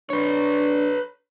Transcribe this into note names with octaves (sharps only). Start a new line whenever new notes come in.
D4 B4 C#5